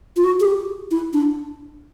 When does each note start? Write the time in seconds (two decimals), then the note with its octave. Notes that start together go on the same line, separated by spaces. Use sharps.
0.16 F4
0.24 F#4
0.40 G#4
0.45 G4
0.91 E4
1.13 D4